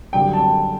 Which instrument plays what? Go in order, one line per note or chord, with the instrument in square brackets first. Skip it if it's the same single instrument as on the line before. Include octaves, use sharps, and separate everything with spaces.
[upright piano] F#2 D3 G3 G5
A5